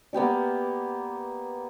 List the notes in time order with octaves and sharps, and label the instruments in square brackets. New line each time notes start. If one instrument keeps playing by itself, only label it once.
[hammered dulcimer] A#3 B3 G4 D5